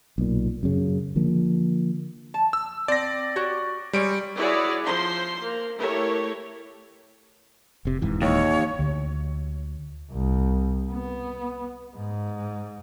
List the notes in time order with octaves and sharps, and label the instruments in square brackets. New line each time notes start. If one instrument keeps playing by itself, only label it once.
[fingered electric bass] B1 A#2
F#2 C#3
D3 F3 A#3
[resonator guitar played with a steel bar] A5
[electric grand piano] E6
[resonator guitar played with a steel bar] C4 [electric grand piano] D5 A#6
[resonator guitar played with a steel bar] F#4 G4 C#5
[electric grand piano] G3 D7 [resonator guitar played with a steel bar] G#3 C#5
[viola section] E4 F#4 G#4 B4 C#5 D5
F3 C5 C6
A#3
A3 E4 G4 A#4 C#5
[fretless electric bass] F1 C3
D#1 G#2 E3
[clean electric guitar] D#2 [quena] C#5
[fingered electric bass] D2
[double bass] C2
B3
G#2